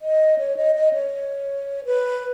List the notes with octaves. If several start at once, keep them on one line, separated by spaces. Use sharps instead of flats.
D#5
C#5
D#5
D#5
C#5
B4